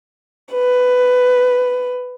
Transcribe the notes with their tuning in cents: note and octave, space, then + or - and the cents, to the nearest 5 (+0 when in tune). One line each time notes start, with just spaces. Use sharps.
B4 +10